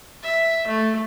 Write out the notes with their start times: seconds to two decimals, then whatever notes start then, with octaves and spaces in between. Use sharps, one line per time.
0.23 E5
0.67 A3